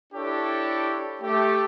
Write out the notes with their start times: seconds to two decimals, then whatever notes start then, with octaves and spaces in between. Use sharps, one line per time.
0.13 D4 E4 G4 A4 C#5
1.22 A3 G4